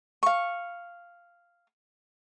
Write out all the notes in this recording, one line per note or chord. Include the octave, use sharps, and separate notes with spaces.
F5 C#6